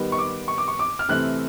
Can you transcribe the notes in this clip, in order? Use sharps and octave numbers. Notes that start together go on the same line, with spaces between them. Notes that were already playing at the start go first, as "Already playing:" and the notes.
Already playing: D#3 G3 B3
C#6
D6
C#6
D6
C#6
D6
F6
C3 E3 A3 C4 F#6